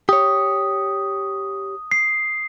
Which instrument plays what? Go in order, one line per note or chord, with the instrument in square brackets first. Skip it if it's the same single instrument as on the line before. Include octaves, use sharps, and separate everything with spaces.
[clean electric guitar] G4 C#5 [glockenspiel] D#6
[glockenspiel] C7